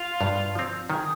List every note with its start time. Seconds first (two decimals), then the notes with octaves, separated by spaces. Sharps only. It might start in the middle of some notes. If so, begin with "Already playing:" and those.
Already playing: F4
0.21 G2
0.55 F3 C4
0.90 D#3 G#4